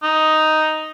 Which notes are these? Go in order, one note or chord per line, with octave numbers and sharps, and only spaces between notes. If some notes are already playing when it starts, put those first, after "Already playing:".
D#4